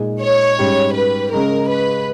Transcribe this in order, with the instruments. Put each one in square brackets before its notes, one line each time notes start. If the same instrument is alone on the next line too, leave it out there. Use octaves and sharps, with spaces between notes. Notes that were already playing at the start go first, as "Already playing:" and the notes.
Already playing: [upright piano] A#2 G#3 D#4 G#4
[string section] C#5
[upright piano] G#2 G3 C#4 G4
[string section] B4
[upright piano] C#3 G#3 C#4 [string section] A#4
[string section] B4